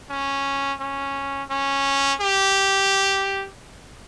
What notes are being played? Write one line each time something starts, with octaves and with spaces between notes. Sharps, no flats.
C#4
C#4
C#4
G4